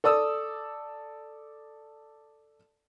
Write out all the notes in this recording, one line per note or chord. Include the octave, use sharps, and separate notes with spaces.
A4 D5 D#6 E6